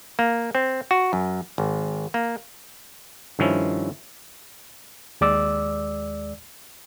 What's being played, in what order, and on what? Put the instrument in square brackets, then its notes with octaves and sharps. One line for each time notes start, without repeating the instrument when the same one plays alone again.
[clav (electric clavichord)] A#3
C4
F#4
F#2
G#1
A#3
G2 D#3 F3 C#4 E4
[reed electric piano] D#2 G#3 D5 D6 E6